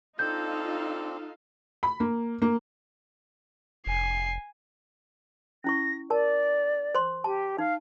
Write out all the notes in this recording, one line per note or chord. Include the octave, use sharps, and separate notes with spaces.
C4 D4 D#4 F4 A4 F5 G6
B5
A#3
A#3
F1 G#5 C7
C#4 E4 C#6 A#6
A#4 D5 A5
C5 C6
G4 A5
D#4 F5